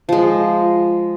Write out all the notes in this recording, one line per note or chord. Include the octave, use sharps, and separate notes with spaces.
F3 G#3